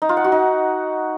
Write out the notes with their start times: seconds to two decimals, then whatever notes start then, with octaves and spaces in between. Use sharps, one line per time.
0.02 D#4
0.09 F4
0.17 F#5
0.24 F#4
0.32 D#4